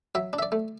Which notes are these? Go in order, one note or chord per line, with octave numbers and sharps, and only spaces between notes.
F#3 E5
D4
E5
D5
A3